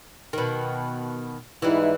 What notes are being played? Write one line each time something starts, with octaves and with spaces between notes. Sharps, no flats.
B2 D#3
G#2 E3 G3 D#4 E4